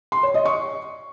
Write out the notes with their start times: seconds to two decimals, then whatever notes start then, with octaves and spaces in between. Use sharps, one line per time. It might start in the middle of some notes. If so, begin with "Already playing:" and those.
0.12 C6
0.23 C#5
0.34 D#5
0.45 C#6